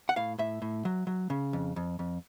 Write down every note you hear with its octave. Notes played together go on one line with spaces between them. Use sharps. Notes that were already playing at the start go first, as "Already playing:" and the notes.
F#5
A2 F5
A2 E5
A2
F#3
F#3
C#3
F2
F2
F2